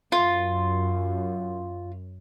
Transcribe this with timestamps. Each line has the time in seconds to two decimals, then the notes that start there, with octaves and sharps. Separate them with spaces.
0.12 F#2 F4